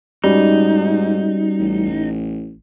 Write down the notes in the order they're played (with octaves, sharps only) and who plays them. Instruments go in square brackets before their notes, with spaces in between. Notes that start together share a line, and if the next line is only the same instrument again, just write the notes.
[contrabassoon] G#2 [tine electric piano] G3 C#4 F#4 [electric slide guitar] D#4
[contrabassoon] A1